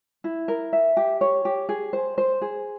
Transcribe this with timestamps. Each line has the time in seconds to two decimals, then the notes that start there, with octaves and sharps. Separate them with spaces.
0.24 E4
0.48 A#4
0.73 E5
0.97 G4
1.21 C#5
1.45 G4
1.69 G#4
1.93 C5
2.18 C5
2.42 G#4